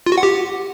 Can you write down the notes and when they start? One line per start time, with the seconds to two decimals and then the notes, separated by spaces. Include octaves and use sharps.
0.06 F4
0.12 F#4
0.18 F#5
0.23 G4